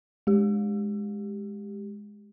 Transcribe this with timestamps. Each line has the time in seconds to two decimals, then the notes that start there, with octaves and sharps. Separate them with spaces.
0.27 G#3 G4